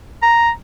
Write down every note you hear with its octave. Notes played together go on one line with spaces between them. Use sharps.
A#5